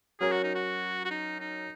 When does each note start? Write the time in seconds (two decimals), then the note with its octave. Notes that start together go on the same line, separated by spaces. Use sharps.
0.20 F#3 C#4 G#4 A#4 C#5
0.32 F#4
0.44 D#4
0.55 F#4
1.05 F#4
1.10 D#4
1.40 D#4